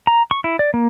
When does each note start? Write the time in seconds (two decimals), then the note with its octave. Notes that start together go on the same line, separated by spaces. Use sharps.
0.07 A#5
0.31 C#6
0.44 E4
0.59 D5
0.74 A#3